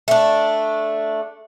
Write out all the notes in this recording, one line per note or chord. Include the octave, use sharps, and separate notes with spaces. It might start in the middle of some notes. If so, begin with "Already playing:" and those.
A3 D4